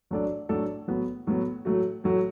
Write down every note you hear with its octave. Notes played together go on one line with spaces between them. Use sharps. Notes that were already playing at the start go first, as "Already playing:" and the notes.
A2 F#3 D4 A4 D5
A2 F#3 D4 A4 D5
A2 F#3 B3 F#4
A2 F#3 B3 F#4
A2 F#3 A3 F#4
A2 F#3 A3 F#4